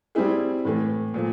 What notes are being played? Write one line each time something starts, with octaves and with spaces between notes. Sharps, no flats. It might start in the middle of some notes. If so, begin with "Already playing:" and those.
G3 C4 E4 G#4
A2 E3 A3
A#2 F3